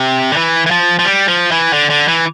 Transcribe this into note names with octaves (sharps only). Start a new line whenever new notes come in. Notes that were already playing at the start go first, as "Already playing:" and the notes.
Already playing: C3
D3
E3
E3
F3
F3
G3
F3
E3
D3
D3
E3